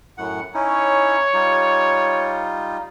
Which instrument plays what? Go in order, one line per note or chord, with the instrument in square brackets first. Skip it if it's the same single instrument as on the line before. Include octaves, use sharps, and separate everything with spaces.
[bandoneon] F#2 A2 F#5
[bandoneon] C#4 D#4 E4 [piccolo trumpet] C#5
[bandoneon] G3 D#4 F4